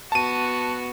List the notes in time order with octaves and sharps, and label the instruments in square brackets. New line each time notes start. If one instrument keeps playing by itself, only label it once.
[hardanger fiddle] B3 F#4 [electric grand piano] A5 D#7